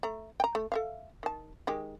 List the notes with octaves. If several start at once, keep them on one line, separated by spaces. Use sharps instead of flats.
A3 A#5
G5 A#5
A3
A4 E5 F5
D#3 A5
D#3 G#3 G4